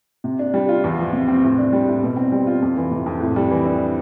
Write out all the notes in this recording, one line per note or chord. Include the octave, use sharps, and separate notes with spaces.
C3
D4
G3
F4
E2
F3
C3
C4
A2
D4
G3
A2
B2
C4
G3
F4
F2
E3
C3
F2
A2
G3
E3
D4